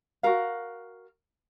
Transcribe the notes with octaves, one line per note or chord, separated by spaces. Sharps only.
F#4 A#4 F5